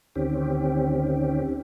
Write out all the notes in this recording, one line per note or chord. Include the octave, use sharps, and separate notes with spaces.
D2 D#3 C4 C#4 G4